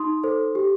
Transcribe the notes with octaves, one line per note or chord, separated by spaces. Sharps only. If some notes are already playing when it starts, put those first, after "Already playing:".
Already playing: D#4 C6 D#6
A4 C5
G4